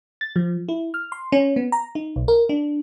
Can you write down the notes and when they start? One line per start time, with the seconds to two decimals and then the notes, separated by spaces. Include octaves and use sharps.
0.21 A6
0.36 F3
0.69 E4
0.94 F6
1.12 C6
1.32 C#4
1.56 B3
1.72 A#5
1.95 D#4
2.16 B1
2.28 A#4
2.49 D4